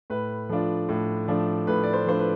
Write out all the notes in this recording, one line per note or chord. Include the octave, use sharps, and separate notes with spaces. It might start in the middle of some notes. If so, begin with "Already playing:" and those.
A2 B4
F3 A3 D4 F4
A2
F3 A3 D4 F4
A2 B4
D5
C5
F3 A3 D4 F4 C5
B4